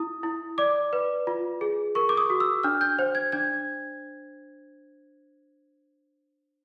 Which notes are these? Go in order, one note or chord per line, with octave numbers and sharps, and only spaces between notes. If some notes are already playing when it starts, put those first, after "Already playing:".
Already playing: E4 D#6
E4
D5 D6
B4
F4
G#4
A#4 C#6
D6
D#6
F#4
E6
D4 F6
G6
C5
G#6
D4 G#6